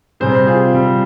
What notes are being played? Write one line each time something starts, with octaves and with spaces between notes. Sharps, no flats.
C3 G3 C4 G#4 C5
F4 G#4
C3 G3 C4